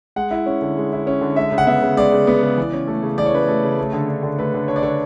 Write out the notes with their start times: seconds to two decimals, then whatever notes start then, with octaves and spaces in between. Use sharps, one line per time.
0.16 G#3 F#5
0.31 E4
0.46 C#4
0.62 D3
0.77 G#3
0.92 E4
1.07 C#4
1.21 D3
1.36 G#3 E5
1.52 C#3
1.58 F#5
1.67 B3 E5
1.82 C#3
1.97 G#3 D5
2.12 C#3
2.27 B3
2.42 C#3
2.58 E3
2.73 C#4
2.87 A3
3.03 C#3
3.18 E3 D5
3.26 C#5
3.33 C#4 B4
3.42 C#5
3.48 A3
3.63 C#3
3.78 A3
3.93 D3
4.08 D4
4.23 D3
4.39 A3 B4
4.54 D3
4.68 D4 C#5
4.76 D5
4.83 D3 C#5